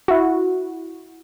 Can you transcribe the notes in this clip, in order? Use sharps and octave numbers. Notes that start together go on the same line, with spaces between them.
E4 F#4